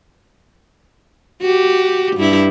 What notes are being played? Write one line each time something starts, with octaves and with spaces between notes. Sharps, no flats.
F#4 G4
G2 E4